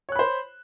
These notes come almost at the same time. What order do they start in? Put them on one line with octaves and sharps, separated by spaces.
C#5 F#6 B5 C5